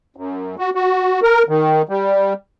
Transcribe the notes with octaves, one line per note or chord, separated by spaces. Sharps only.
F#2
F#4
F#4
A#4
D#3
G3